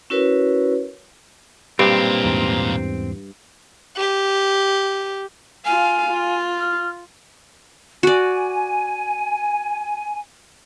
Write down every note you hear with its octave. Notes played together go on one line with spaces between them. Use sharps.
C#4 E4 F#4 A#4 B4 C#5
B1 G2 A#2 C4
E2 G#2
G4
F4 F5 G#5
F4
F6
F#4 D5 G#5